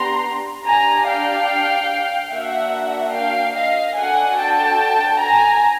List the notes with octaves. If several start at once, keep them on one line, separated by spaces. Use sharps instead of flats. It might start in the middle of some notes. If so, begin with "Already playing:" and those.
Already playing: B3 D4 G4 A#5 C6
D4 G4 G#5 A#5
F5 G5
A#3 D4 F#4 E5 F#5
F5 G5
D#5 F5
D4 F#4 A4 F#5 G#5
G5 A5
G#5 A#5